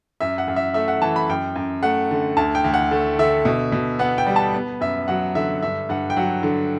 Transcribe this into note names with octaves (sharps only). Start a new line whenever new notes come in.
F#2 E5
F#5
F#2
E5
A3 E5
F#5
E3 A5
B5
F#2 G5
F#2
A3 F#5
D3
D2 A5
G5
D2
F#5
A3
D3 E5
B2
B2
B3 F#5
G5
G3
A5
B3
F#2 E5
F#3 F#5
D3 E5
G2 E5
G2 F#5
G5
F#3 F#5
D3